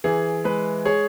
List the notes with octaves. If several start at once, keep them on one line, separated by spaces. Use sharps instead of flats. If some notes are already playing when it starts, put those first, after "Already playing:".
E3 G#4
G#3 B4
G#4 C#5